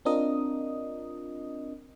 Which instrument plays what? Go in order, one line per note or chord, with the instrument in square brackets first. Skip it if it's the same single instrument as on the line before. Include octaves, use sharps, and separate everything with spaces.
[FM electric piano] C4 D4 F4 A#4 D#5 D#6